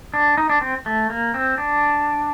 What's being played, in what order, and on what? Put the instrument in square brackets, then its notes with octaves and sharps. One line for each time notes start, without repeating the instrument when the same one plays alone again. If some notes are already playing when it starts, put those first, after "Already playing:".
[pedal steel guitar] D4
D#4
D4
C4
A3
A#3
C4
D4